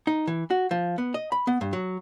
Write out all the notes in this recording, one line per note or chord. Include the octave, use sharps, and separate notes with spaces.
D#4
E3
F#4
F3
B3
D#5
B5
B3
G2
F#3